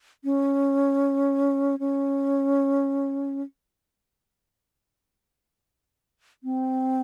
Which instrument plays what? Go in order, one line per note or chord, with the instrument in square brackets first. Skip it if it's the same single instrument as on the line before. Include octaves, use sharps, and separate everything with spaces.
[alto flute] C#4
C#4
C4